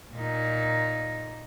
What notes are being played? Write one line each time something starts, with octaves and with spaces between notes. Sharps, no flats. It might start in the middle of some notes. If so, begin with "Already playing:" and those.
A#2 D#4